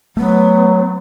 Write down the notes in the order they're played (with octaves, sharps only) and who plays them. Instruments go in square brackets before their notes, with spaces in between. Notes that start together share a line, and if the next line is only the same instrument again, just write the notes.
[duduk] F#3 [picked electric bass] A3 [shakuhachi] B3